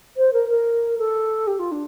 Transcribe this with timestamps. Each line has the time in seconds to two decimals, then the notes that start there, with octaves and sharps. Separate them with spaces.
0.17 C5
0.33 A#4
0.49 A#4
0.98 A4
1.47 G4
1.59 F4
1.72 D4